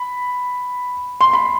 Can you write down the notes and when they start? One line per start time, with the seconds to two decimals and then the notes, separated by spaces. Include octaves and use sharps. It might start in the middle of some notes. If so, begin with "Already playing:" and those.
Already playing: B5
1.21 C6
1.33 B5